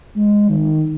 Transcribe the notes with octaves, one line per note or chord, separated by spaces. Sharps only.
G#3
D#3